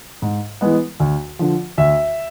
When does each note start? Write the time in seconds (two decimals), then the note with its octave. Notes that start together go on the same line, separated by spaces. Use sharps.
0.22 G#2
0.61 E3 G#3 B3
1.00 D2
1.39 D3 F3
1.78 D2 E5